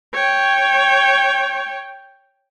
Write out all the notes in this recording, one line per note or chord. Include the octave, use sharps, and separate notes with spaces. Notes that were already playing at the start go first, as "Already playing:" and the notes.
C#5 G5